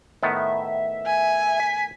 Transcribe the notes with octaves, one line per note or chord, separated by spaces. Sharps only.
A2 D#3 B3 E5
G#5
B6